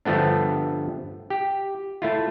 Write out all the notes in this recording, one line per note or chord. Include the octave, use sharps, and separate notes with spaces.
G2 D3 F3 A3 B3 D4
G4
A3 E4 F4